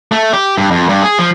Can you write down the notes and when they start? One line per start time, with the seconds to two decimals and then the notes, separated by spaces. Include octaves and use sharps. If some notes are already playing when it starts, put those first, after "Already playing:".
0.12 A3
0.33 G4
0.58 G2
0.71 F2
0.89 G2
1.03 G#4
1.18 F3